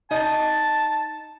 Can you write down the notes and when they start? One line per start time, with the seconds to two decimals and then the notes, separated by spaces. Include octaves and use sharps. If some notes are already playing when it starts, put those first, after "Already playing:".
0.11 D#4 D#5 A5